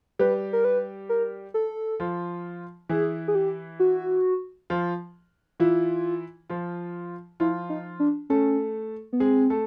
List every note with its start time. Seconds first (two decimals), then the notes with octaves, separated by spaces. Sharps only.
0.19 G3 G4 B4
0.53 A#4
0.65 B4
1.09 A#4
1.54 A4
2.00 F3 F4
2.89 E3 E4 G#4
3.28 G#4
3.35 G4
3.80 F#4
4.70 F3 F4
5.60 E3 E4 F4
6.50 F3 F4
7.40 F3 E4 F4
7.69 D#4
8.00 D4
8.30 A3 C#4 A4
9.13 B3
9.20 G#3 C4 G#4
9.50 A3 A4